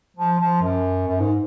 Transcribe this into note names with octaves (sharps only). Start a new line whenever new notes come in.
F3
F3
F#2
F#2
G#2